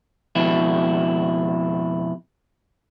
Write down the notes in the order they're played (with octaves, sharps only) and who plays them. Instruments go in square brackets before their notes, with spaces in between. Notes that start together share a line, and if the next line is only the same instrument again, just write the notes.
[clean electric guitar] F2 B2 E4